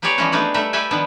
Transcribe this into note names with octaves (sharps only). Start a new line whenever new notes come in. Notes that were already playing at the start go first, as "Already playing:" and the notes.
F#3 B3 G4 G#4 C#5 D5
E3 F3 G3 G#3 C#4 F#4
A3 B3 D4 D#4 G#4 D5
G3 A3 D#4 A#4 E5 F#5
G4 A4 B4 E5 G5 G#5
D#3 F3 G3 B3 D4